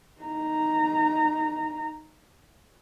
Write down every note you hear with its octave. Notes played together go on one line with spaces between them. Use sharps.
D#4 A#5